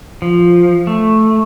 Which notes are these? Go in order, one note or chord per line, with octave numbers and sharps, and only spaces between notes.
F3
A3